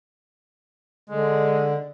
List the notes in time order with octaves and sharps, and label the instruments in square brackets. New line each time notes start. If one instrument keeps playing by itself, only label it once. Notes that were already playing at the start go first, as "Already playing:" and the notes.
[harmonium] D3 [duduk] G#3